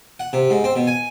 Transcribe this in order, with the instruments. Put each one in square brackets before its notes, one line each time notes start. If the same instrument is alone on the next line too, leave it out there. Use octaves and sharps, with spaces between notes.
[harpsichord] F#5
C3
G#2
C4
B2
G#5